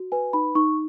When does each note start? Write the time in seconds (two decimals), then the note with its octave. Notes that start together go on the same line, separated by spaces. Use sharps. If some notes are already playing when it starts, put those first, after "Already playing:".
Already playing: F#4
0.12 B4 G#5
0.33 D#4 B5
0.55 D#4 C#6